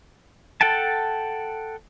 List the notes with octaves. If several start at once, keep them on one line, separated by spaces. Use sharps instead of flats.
A4 F#5 G5 A5